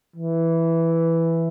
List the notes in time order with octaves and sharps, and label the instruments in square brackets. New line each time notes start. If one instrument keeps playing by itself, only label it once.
[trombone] E3